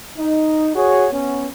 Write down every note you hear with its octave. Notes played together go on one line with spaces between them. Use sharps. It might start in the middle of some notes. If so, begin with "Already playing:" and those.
D#4
F#4 G#4 C#5
B3 C#4